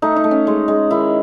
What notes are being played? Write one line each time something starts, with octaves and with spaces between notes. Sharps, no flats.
A3 D#4
D#4
A3
C#4
G#3
G#3
D#3 E4